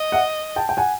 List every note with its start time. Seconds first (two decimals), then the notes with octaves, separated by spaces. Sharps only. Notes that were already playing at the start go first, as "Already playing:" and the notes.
Already playing: D#5
0.12 E5 F#5
0.56 G5 A5
0.69 G5
0.77 F#5 G#5